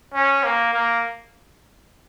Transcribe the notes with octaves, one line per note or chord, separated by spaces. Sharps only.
C#4
A#3
A#3